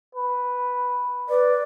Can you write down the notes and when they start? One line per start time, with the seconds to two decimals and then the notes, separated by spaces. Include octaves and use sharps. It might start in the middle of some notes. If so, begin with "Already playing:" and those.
0.15 B4
1.29 B4 D5